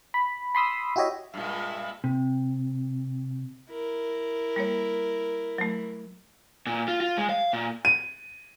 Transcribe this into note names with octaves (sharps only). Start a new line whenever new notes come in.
B5
B5 C6 D#6 E6
E4 F#4 G4 C#5 D#5 E5
G2 A#2 G#3 E5
C3
E4 A#4
G3 A#3 C#5
F#3 A3
A#2
F4
F4
G#3
F5
A#2
D#7